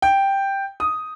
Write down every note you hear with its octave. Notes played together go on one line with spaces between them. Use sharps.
G5
D#6